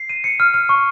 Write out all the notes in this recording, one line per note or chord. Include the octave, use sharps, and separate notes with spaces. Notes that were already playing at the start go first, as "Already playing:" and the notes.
Already playing: C7
D#7
C#7
F6
F6
C#6